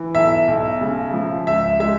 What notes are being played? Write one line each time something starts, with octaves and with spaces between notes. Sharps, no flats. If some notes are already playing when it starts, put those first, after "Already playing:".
Already playing: E3
B1 E5
B1
C#3
F3
C#2 E5
G#3 E5